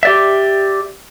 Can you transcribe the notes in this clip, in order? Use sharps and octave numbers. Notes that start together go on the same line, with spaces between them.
G4 D5 E5